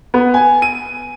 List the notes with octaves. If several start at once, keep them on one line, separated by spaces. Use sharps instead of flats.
B3
G#5
D#7